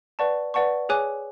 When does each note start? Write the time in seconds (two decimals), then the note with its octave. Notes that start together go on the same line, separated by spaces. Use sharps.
0.19 B4 D5 F#5 A5 C#6
0.54 B4 D5 F#5 A5 C#6
0.89 G#4 C#5 G#5 D6 F#6